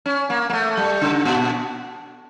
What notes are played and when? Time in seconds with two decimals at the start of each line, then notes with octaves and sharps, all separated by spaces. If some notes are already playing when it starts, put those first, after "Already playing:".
0.06 C#4
0.30 A#3
0.50 A#3
0.53 A3
0.77 G3
1.02 C#3
1.25 A#2